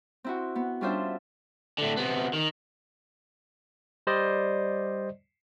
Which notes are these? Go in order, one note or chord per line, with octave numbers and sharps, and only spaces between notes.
C4 E4 F#4
B3
G3 C#4 D4 F4 C5 E5
A2 D3
C3 B3
D#3
G3 C5 D5 D#5